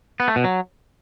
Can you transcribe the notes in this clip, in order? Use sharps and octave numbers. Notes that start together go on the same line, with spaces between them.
B3
A3
B2
F#3